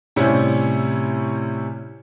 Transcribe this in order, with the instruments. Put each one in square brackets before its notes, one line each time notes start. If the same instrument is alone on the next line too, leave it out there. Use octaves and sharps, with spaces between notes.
[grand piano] A2 C3 G3 C#4 E4